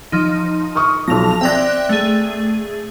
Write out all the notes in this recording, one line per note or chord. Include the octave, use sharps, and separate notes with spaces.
F3 D#4
C#6 D#6 F6
B1 F3 A#6 F7
C4 D5 E5 G5 F#6 A#6
A3 G#4